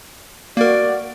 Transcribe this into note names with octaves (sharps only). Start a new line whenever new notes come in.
A#3 F#4 A#4 D5